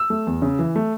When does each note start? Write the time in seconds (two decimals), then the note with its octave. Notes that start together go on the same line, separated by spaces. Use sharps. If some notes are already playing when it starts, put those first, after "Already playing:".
Already playing: E6
0.10 A3
0.27 E2
0.42 C#3
0.59 E3
0.76 A3